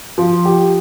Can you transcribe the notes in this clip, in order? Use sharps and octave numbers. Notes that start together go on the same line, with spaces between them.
F3
G4